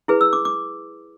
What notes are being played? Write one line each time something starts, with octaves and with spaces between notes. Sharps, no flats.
E4 G#4 B4
E6
D6
D6